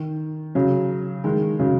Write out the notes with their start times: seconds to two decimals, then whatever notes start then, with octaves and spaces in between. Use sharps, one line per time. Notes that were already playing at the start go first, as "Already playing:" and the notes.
Already playing: D#3
0.55 C#3 F#3
1.24 D#3 G#3
1.59 C#3 F#3